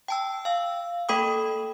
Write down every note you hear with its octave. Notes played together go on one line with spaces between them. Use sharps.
G5 A5 E6
F5 E6
A#3 A4 G5 B5 D6 D#6